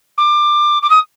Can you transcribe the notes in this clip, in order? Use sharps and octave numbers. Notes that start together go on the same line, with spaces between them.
D6
D6
D#6